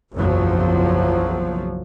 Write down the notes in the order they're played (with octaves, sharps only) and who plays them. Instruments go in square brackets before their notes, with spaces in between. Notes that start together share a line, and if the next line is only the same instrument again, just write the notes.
[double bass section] F#1 B1 E2 F3 F#3